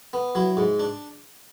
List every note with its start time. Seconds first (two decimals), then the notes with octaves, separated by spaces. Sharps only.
0.13 B3
0.35 F#3 E4
0.57 G#2
0.80 D4